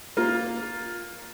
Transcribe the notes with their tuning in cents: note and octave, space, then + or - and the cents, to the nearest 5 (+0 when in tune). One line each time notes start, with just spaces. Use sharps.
A#3 +0 F4 +10